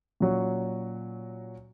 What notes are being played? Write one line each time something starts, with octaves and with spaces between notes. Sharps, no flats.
A#2 F#3 C#4 F#4